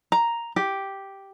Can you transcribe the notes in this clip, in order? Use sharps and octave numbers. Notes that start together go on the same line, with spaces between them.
A#5
G4